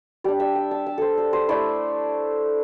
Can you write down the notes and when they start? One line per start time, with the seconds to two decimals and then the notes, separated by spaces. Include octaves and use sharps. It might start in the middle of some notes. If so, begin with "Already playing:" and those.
0.24 G3 D4 D5
0.40 E5
0.55 G5
0.71 A5
0.86 A5
0.98 A4 C5
1.18 A4
1.33 C5
1.49 A3 E4 D5